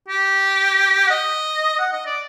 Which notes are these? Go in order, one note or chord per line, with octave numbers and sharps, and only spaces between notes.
G4
F#5
D#5
F#5
D#5
D5